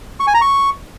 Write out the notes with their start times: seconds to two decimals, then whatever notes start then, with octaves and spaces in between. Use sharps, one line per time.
0.20 C#6
0.27 G#5
0.34 A#5
0.41 C#6